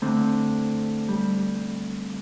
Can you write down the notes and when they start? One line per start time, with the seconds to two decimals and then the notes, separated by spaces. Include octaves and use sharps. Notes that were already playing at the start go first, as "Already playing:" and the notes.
0.02 D3 A3 C4 D4
1.08 G3